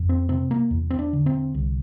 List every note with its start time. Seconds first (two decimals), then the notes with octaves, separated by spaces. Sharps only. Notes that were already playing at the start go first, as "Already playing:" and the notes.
Already playing: F2
0.09 C4
0.29 C3 C4
0.51 A#3
0.71 E2
0.90 C4
0.99 D4
1.13 D3
1.26 C4
1.54 C2